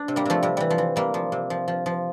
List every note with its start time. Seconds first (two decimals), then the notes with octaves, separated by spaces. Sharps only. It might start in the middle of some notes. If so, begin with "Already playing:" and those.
Already playing: D4
0.08 C3
0.16 G3 A#3
0.25 C3 F3 A3
0.43 C3 G3
0.57 E3 G3
0.70 F3
0.78 E3
0.96 C3 G3 A#3
1.14 F3
1.32 C3
1.50 F3
1.68 F3
1.86 F3